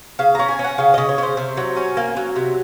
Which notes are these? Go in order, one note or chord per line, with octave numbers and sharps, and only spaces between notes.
C#3 F5
C#4 A#5
G#5
C#4 F#5
C#3 F5
C#3 D#5
C#5
C#3 C5
C3
F#3
C#4
A#3
F#3
C3